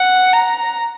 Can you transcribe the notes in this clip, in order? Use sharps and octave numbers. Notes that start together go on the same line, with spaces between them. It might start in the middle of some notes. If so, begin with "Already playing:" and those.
Already playing: F#5
A#5